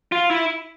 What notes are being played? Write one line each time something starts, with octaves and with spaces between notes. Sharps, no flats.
F4
E4